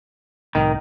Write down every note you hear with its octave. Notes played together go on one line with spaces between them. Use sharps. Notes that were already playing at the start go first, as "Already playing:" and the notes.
C2 A2 D#3